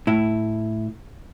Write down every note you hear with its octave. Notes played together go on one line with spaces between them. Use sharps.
A2 E4